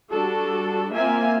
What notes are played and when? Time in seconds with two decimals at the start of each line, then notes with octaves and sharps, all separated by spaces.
0.12 G3 D4 F#4 A4
0.93 A#3 C4 F4 E5 G#5